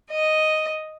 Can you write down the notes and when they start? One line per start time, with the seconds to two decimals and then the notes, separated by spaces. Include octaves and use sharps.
0.09 D#5